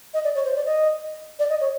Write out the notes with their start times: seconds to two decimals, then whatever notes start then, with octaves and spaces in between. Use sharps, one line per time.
0.14 D#5
0.24 D5
0.35 C#5
0.45 C5
0.56 D5
0.66 D#5
1.39 D5
1.50 D#5
1.61 C#5